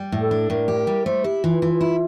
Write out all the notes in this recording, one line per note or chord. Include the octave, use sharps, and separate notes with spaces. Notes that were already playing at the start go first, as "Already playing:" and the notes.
Already playing: G3
A2
A4
D4
A2 A#4
G4
G3
A3 C5
E4 G4
E3 F4
E3
E4